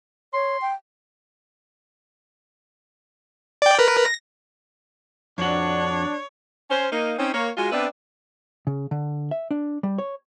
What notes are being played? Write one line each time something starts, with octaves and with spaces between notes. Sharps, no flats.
C#5 C6
G5
D5 G5
A#4 B4
A#6
F2 D4 F#4 C#5
C#4 C5
A#3 D#4
C4 C#4 D#4
A#3 C#5
G#3 F4 F#4
B3 C4 D4 B4 D5 E5
C#3
D3
E5
D4
G3
C#5